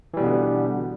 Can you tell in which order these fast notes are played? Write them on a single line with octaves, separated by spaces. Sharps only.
E3 G3 B2 B3 D3